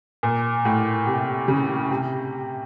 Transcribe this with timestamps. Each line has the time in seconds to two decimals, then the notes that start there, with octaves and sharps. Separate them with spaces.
0.23 A#2
0.65 A2
1.06 C3
1.48 C#3
1.90 C3